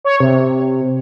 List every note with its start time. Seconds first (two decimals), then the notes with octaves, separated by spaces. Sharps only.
0.05 C#5
0.20 C3